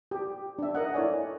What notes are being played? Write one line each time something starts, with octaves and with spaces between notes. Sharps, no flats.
G4
D4 E5
A#4 D#5 F#5
E4 A4 C#5 D5 G#5